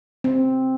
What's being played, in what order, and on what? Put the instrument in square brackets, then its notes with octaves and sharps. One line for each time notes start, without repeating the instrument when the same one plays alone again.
[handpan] C4